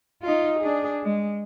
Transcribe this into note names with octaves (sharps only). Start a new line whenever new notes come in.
D#4 F4
D4 G#4
G#3